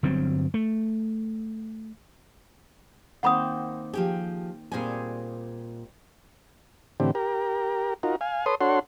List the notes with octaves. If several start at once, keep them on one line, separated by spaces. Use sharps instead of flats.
G1 G2 F#3 C4
A3
D#3 A#3 C4 F#5 B5 D#6
F3 G4 G#4 G5
A#2 G3 C4 G#4 G#5
A2 D3 E3 C4 G4
G4 A#4
D#4 F4 F#4 A#4
F5 G#5
A4 B4 C#5 C6 D#6
D4 F#4 A4 C#5 F#5 C6